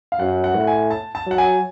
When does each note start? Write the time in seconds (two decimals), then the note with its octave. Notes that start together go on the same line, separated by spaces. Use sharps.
0.12 F5
0.19 F#2 F#5
0.44 F#5
0.55 A2
0.67 G#5
0.91 A5
1.15 A5
1.26 F#3 F#5
1.38 G#5